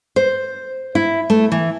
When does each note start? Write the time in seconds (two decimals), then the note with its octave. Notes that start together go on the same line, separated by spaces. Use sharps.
0.16 C5
0.95 E4
1.30 A3
1.52 E3